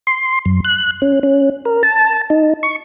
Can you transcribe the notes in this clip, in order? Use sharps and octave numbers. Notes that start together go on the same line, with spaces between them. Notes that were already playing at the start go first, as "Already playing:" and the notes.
C6
F#2
F#6
C#4
C#4
A#4
A5
D#4
C#6